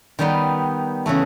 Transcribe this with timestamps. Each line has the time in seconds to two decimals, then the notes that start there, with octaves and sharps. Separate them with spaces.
0.19 D#3 G3 B3 D#4
1.06 C#3 E3 A3